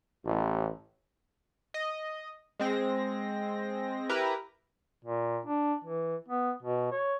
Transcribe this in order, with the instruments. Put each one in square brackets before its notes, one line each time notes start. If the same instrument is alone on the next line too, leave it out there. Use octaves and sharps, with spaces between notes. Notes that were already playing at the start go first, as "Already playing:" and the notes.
[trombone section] A1
[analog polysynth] D#5
G#3 C4 A#6
E4 G4 A#4 B4 A#5
[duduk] A#2
D4
E3
B3
B2
C#5